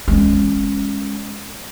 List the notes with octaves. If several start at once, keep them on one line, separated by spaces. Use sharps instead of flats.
G#3 C#4